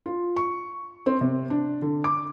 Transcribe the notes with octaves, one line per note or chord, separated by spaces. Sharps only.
F4
C#6
C4
C3
D4
D3
D6